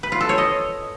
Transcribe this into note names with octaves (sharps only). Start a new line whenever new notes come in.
B4
F4
A4
C#5
D#5